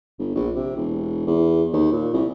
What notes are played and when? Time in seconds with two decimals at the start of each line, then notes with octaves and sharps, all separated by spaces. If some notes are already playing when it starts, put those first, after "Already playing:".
0.19 G1
0.35 A#1
0.55 C3
0.76 E1
1.27 E2
1.73 D#2
1.92 A#2
2.13 C2